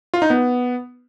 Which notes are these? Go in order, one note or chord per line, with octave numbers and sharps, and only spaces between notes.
F4
D#4
B3